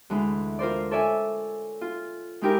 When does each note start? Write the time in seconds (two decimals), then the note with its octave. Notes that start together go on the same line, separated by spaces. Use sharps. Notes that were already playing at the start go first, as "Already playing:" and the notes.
0.10 D2 E3 G#3
0.59 F4 A#4 C5 D5
0.91 A4 C#5 D5 E5 G#5
1.81 F4
2.41 G#3 D#4 E4 G4 G#4 A#4